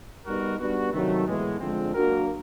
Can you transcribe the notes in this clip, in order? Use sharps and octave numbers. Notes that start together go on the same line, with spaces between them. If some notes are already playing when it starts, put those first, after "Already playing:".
G3 B3 D#4 F#4 A#4
G3 B3 D4 F#4
C3 D#3 F#3 A3
A2 E3 G#3 B3
D3 F3 G#3 C4
F#3 A#3 D4 F#4 A#4